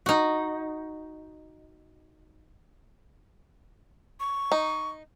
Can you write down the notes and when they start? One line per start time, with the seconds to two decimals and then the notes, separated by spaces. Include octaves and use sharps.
0.06 D#4 F#4
4.20 C#6
4.52 D#4